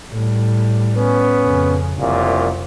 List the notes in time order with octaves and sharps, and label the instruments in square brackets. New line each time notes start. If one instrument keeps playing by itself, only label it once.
[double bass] A2 G3
[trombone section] B3 C#4
[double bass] F2 C#3
[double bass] F1 [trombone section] C2 F#2 A#2